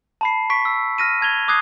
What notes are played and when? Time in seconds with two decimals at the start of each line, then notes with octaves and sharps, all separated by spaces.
0.21 A5 B5 C7
0.50 C#6 B6 D7
0.65 E6
0.98 F6 A#6 D#7
1.21 A5 G#6 F7 G7
1.48 D6 D#6 F#6 G#6 C7